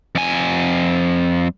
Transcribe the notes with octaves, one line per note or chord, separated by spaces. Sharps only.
F2 G#5